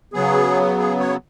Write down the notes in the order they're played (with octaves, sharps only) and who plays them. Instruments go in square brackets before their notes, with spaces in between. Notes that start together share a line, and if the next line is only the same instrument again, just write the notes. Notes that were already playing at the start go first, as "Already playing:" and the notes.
[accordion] C#3 F#3 B3 G#4
G#4
C#5